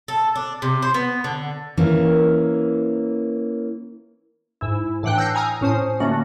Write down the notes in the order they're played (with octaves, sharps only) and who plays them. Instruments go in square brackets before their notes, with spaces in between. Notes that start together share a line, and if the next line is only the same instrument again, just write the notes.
[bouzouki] A4
D4
C3
C5
B3
D3
[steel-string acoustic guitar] E3 A#3 C#4 A#4
[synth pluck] G#2 E4
A2 E3 D4 F#5 G5 F#6
E6 F#6 G6 A#6 C7 C#7
G#5 A#5 D#6 F6 A#6
A2 C#4 C5 D#6
D3 A3 A#3 C#4 F#4